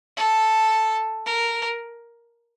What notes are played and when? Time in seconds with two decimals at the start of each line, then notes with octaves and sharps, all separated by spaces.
0.17 A4
1.26 A#4